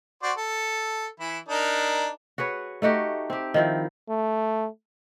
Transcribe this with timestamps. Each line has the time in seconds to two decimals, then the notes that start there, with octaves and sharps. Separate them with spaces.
0.23 F#4 C5 D5
0.38 A4
1.20 E3 E4
1.49 D4 D#4 A#4
2.38 F#4 G#4 B4 C#5
2.82 A3 D#4 F#4 G4
3.30 C4 G4
3.54 D#3 F3 E4
4.09 A3